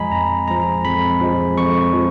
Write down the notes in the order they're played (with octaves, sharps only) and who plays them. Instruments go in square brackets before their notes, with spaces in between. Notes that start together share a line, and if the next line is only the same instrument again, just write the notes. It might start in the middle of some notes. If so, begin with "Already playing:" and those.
Already playing: [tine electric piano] F2 F3 G#3 D#5 G#5 A#5 B5
F2 A#5
F3 G#3 A#5
F2 B5
F3 G#3
F2 C#6
F3 G#3